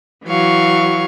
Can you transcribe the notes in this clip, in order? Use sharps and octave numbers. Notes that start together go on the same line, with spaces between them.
E3 F#3 F5 C#6